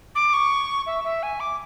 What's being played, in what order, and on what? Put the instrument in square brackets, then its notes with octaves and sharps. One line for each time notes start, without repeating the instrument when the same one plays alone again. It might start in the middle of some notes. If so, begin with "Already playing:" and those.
[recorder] D6
C#6
E5
E5
G#5
D6